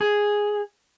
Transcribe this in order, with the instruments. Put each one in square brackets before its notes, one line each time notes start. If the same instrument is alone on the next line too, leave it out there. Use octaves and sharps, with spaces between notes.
[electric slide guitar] G#4